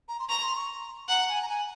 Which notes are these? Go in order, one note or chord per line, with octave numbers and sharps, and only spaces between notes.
A#5
C6
A#5 C#6
C6
C#6
F#5 A#5
G#5
A#5
G#5